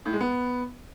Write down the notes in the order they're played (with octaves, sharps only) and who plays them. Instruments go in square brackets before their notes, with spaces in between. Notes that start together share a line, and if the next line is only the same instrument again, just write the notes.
[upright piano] A2
G#3
B3